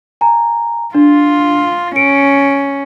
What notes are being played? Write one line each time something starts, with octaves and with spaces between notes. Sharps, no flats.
G#5 A#5
D4 F4
C#4 C#7 D7